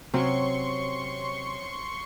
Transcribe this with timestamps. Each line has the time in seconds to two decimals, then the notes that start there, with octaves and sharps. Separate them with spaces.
0.14 C3 F#3 C4 C#4 C#5 C6 C#6 C#7